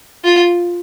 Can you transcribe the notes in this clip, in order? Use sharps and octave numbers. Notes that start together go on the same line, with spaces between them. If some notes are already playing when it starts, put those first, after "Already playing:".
F4